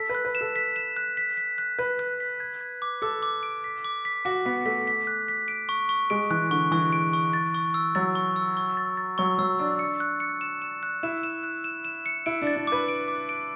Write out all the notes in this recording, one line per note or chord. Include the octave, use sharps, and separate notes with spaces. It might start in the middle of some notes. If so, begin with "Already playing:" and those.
Already playing: A4 B6
B4
F#6
B4
E7
A4
B6
E7
F#6
B6
B6
F#6
B4 F#6
F#6
B6
G#6
G#6
D6
A4 D6
D6
D7
B6
D6
B6
F#4 D6
B3 B6
A3 B6
B6
F#6
B6
D7
C#6
C#6
G#3 D7
E3 F#6
D3 C#6
E3 C#6
D7
C#6
A6
C#6
E6
F#3 A6
C#6
E6
C#6
A6
A6
F#3 C#6
F#3 E6
D4 E6
C#7
F#6
C#7
E7
E7
F#6
E4 E7
E7
F#6
E7
E7
C#7
E4 D7
D4
A6
D4
B4 D6
D7
D6
D7